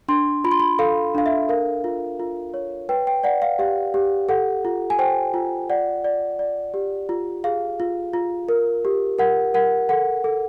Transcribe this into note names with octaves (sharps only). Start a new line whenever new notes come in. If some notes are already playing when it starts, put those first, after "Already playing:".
D4 C6
F4 B5
C6
B5
A4 F5
D4 F5
E5
A#4 F5
F4
F4
C#5
B4 G5
G5
D5 F#5
F5
G4 F5
G4
A4 F#5
F4
G#5
C5 G5
F4
D5 F#5
D5
D5
G4
F4
G#4 F5
F4
F4
A#4
G4
A#4 F#5
A#4 F#5
A4 F#5
A4